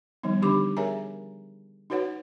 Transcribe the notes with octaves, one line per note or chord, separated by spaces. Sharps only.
D#3 F3 G3 B3 D#4
D3 D4 D#4 G4 B5 D6
G#4 A#4 C#5 E5 G#5 A#5
D#4 F#4 B4 C#5 F#5